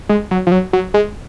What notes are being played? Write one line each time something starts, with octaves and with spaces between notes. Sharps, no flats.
G#3
F#3
F3
F#3
F#3
G#3